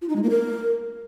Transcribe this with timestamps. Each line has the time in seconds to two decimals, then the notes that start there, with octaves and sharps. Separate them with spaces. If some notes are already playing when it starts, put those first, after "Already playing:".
0.02 F4
0.09 D#4
0.16 G#3
0.23 A#3
0.30 A#4